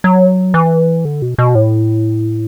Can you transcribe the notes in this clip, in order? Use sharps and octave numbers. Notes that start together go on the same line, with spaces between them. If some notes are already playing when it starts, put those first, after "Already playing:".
F#3
E3
D3
B2
B2
A2